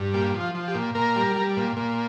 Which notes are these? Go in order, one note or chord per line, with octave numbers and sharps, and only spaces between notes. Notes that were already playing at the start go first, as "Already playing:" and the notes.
Already playing: G2
A#2 G4
F3
F4
F3
G4
A#2
A#2 A#4
G3
G3
A#2
A#2